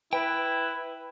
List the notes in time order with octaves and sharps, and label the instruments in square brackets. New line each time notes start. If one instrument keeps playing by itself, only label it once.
[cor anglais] E4 [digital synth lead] B4 [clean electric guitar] G5